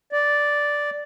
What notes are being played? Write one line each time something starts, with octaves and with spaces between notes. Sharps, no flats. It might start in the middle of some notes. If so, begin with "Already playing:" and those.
D5